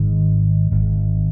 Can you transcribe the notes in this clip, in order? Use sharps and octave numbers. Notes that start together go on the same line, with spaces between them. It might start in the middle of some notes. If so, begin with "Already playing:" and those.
Already playing: G#1 G#2 D#3
G#1 G#2 D#3